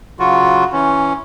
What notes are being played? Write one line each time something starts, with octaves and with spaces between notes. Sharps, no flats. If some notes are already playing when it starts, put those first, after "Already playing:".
C#3 F#3 F4 F#4
E3 C#4